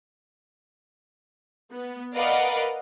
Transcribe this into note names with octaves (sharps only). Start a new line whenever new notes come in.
B3
A#4 B4 D5 D#5 F5 F#5